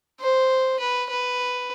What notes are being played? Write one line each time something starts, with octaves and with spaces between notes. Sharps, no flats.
C5
B4
B4